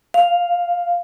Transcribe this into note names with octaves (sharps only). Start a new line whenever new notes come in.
F5